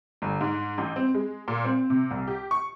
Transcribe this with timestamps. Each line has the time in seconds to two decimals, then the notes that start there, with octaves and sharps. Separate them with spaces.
0.22 G1
0.41 G#2
0.78 A1
0.96 C4
1.15 G#3
1.48 A#2
1.64 C4
1.90 C3
2.11 C2
2.28 G4
2.51 C#6